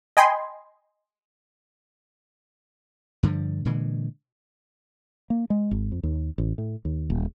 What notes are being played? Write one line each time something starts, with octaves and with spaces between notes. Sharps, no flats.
D#5 G5 G#5 B5 C6
G2 D3 D#3 F3
A#2 D3 E3 G#3
A#3
G#3
G#1
F2
D#2
A1
A2
D#2
D#1